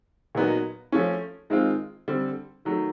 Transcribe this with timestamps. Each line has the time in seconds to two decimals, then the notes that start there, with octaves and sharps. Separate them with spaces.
0.35 A#2 F#3 B3 D#4 F#4
0.92 F3 A3 C#4
1.50 D#3 G#3 C4 F4
2.08 D3 G3 C4
2.65 D#3 F#3 A3